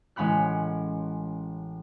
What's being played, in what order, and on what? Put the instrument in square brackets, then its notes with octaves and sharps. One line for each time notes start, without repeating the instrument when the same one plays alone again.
[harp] A1 G#3 C#4 F#5 B5 F#6